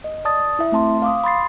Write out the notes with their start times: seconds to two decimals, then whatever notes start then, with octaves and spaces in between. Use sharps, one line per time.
0.04 D#5
0.25 D5 A5 D#6 A6
0.59 E4 E5
0.72 A3 C4 A5 C6
1.02 F5 D6 D#6
1.24 B5 C6 A6 C7